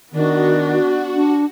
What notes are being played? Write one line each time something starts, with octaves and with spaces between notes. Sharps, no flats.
D#3 B3 D4 F#4
D4